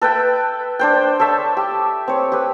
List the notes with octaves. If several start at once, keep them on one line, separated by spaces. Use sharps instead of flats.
A4 B4 E5 G5
D4 C5 G5
A4 C#5 E5 A5
G4
C4 C#5
G4 B4